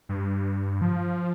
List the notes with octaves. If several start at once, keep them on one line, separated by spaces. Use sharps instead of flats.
G2
F3